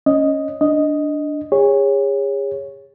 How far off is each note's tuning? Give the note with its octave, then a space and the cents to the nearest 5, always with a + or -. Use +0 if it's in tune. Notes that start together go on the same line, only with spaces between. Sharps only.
C#4 +0 D#5 +0
D4 +0 D#5 +0
G#4 -35 C#5 +0